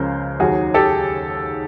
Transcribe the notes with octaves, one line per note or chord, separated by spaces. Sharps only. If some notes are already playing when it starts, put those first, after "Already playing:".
Already playing: C#2 C#3 F3 A#4 C5
D#2 D#3 F#3 F#4 G#4
G4 A4